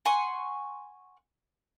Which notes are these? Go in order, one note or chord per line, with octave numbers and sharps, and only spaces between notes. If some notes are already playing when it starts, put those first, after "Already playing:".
F#5 G#5 C6 C#6